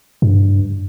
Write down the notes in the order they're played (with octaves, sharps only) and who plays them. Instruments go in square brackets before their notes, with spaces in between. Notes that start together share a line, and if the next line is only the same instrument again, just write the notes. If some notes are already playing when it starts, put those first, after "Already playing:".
[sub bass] G2